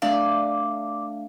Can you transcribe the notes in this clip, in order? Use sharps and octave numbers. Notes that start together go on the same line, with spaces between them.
A3 D4 D5 F5